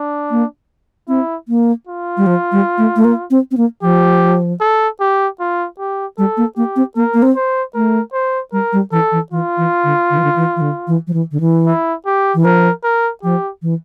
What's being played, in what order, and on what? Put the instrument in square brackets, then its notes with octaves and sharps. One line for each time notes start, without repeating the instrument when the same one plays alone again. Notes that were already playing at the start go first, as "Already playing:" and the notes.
Already playing: [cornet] D4
[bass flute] A#3
[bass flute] C4 [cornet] E4
[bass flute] A#3
[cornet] F4
[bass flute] G3
F3
G3
A3
A3
A#3
C4
C4
A#3
[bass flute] F3 [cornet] G4
[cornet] A4
G4
F4
G4
[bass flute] G3 [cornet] A4
[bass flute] A#3
[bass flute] A#3 [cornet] G4
[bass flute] C4
[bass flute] A#3 [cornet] A#4
[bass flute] A#3
C4
[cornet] C5
[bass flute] A3 [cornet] A#4
[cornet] C5
[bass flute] G3 [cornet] A#4
[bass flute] G3
[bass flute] E3 [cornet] A4
[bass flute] E3
[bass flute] E3 [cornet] F4
[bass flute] E3
D3
D3
E3
D3
E3
E3
D3
E3
F3
E3
D3
E3
[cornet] E4
G4
[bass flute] E3
[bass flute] F3 [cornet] A#4
[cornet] A#4
[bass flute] F3 [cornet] G4
[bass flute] E3